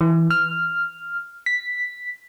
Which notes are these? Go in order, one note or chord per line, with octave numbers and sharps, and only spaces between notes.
E3
F6
B6